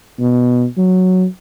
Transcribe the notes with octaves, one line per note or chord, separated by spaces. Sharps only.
B2
F#3